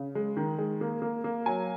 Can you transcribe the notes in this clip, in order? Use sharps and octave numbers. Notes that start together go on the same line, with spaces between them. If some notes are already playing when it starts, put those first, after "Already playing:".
Already playing: C#3
G#3
D#3
G#3
A#3
A#3
A#3
F#3 G#5